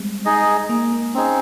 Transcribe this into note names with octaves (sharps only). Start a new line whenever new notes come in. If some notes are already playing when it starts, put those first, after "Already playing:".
Already playing: G3 G#3 C4
D#4 G#4 D#5
A#3
A#3
C4 C#4 D#4 G#4